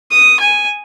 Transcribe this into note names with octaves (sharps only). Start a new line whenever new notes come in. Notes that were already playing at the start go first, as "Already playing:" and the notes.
D#6
G#5